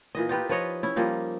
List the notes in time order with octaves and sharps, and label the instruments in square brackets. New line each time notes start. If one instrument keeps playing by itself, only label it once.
[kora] A#2 E3 D#5
D#4 F4 G4 B4
F3 B4 C#5 D#5
C#4 E4
F3 G3 A#3 D#4